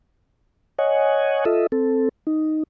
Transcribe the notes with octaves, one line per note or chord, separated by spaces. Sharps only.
C#5 D#5 F#5 G#5
F4 A4 D#5 E5
C4 A4
D#4